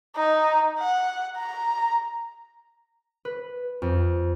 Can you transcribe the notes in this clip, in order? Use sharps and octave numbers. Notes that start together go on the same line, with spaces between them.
D#4
F#5
A#5
B4
F2